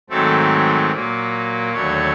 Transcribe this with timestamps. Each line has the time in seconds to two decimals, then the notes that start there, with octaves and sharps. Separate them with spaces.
0.10 G#2 D#3 F#3 A3 C4 A4
0.91 A#2 F#3 A#3
1.73 D#2 D3 F#3 A3 C#5